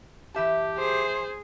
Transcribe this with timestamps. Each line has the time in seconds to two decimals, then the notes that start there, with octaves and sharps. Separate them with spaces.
0.34 E3 G4 E5 A5
0.78 G#4 C5